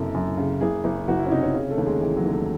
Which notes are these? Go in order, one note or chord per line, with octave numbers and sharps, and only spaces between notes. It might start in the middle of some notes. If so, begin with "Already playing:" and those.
Already playing: F#1 F#2 C3 A4
F#2
C#3
F#1 G#4
F#1
F#1 F#4
E4
C#4
C3 D#4
C#4
C#3 C#4
A3
D#2
G#3
E3 G#3
F#3
D#2
A3